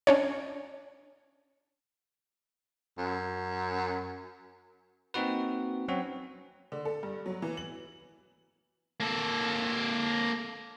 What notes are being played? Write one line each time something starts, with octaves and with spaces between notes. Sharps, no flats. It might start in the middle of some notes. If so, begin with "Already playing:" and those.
C#4 D4 C#5
F#2
A#3 C4 D#4 F#4 B4
F#3 C4 C#4 F#4
D3
A4
G2
F#3
E3
F#7
A#3 A4